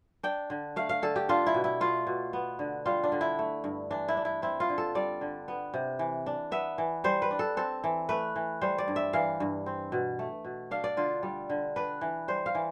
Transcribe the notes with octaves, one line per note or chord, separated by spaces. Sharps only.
D4 G5
D3
A3 F5
F5
D3 A4
G4
D4 F4
E4
B2
E4
A3 F4
B2
B3
D3
G3 F4
D4
D3
E4
A3
G2
E3 D4
E4
D4
E4
C4 E4
F4
D3
A4
G3 D5
D3
B3
C3
E3
D4
B3 E5
E3
G3 C5
B4
D4
A4
C4 A4
E3
A3 B4
E3
G3 C5
D5
G2
E5
E3 F5
G2
C4
B2
A3
B2
D4 F5
D5
D3 F4
G3
D3
D4 B4
E3
G3 C5
F5
E3